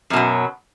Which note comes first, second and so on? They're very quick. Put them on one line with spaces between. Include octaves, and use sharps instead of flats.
F#2 B2 F#3